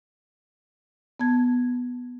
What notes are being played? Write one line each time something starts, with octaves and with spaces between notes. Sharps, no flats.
B3 A5 G#6